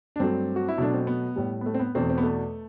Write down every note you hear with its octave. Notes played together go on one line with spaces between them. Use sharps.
D4
G2 F#3 A3 C4
F#4
E4
B2 F#3 A3 D4
C4
B3
A2 G3
B3
A3
C4
B3
E2 B2 A3 C4
C4
B3
A3